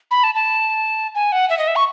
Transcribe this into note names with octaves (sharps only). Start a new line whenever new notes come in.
B5
A5
A5
G#5
F#5
E5
D#5
E5
C#6